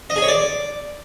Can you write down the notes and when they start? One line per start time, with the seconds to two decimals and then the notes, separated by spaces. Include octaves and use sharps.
0.10 D#5
0.16 G#4
0.22 C#5
0.28 D5